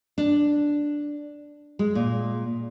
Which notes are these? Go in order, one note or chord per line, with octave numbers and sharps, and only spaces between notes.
D4
G#3
A#2